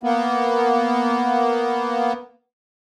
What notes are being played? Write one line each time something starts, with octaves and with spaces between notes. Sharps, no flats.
A#3 B3